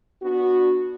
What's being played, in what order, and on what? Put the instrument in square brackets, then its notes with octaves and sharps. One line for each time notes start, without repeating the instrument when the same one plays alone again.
[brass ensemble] B3 D4 F#4